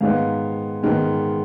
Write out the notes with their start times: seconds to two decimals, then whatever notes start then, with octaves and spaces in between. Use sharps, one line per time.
0.01 G#2 D#3 G#3 B3 F5
0.83 G#2 D#3 G#3 B3